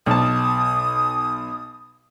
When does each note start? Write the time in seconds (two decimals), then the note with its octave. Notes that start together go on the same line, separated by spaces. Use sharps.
0.06 B1 A5 D#6